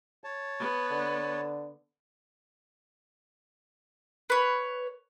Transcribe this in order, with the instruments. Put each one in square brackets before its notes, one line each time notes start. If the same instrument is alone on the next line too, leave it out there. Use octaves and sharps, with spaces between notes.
[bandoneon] C#5 A5
[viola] B3
[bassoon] D3
[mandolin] B4 C#5